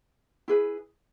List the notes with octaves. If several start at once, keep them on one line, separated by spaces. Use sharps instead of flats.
E4 G#4 B4